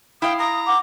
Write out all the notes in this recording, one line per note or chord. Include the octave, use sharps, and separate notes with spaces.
E4 F5 G5 D#6
A#5 D#6
F#5 D6